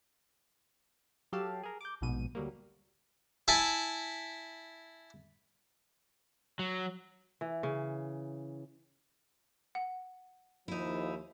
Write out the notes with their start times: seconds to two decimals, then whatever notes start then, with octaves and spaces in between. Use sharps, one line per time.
1.33 F#3 G4 A4 F5 A5
1.63 G#4 A#4
1.81 D6 G6
2.01 A#1 G#2 B2 D#7
2.35 D2 F#3 G3 A#3
3.48 E4 E5 G#5 A5
6.59 F#3
7.41 E3
7.63 C#3
9.75 F#5
10.68 D#2 F3 D#4 E4